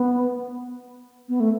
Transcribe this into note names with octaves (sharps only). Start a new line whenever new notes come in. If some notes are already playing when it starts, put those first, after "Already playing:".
Already playing: B3
B3
A3